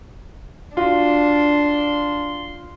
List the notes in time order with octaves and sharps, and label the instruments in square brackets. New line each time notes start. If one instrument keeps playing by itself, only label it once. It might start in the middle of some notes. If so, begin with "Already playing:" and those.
[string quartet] D4 [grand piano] F4 F#4 [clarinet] C6